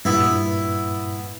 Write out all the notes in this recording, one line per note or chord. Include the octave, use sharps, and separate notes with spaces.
G2 A#2 B3 E4